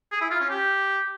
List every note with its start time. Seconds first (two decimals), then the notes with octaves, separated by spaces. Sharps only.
0.12 G#4
0.21 E4
0.31 F4
0.40 C#4
0.50 G4